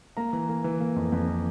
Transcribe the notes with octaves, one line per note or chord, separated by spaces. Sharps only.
A#3 A#5
E3
A#3
E3
A#3
F2
F2
E3